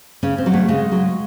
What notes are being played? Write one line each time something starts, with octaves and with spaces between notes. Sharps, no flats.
C#3 C#4
C4
F#3
A3
C#3 G#3
F#3